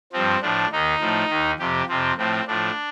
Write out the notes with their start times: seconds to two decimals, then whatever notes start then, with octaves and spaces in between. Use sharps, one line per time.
0.13 G2 F3 C4
0.42 A2 F3 D4
0.72 D#2 D#3 D#4
1.01 A2 F3
1.30 D#2 D#3
1.59 F2 C3 F3 G4
1.88 F2 C3 F3 C4
2.17 A2 F3 C4
2.47 A2 F3 D4